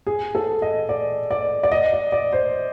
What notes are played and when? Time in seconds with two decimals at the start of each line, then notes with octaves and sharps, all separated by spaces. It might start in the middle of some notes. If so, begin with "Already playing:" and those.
0.07 G#4
0.35 A4
0.62 D#5
0.89 D5
1.31 D5
1.63 D5
1.72 D#5
1.92 D5
2.12 D5
2.33 C5